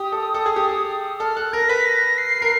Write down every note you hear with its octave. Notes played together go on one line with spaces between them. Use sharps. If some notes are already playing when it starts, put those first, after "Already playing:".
Already playing: G4 D#6
A4
A4
G#4
G4
G#4
A4 F6
A4 F#6
A#4 A#6
B4 B6
A#6
C7
A#4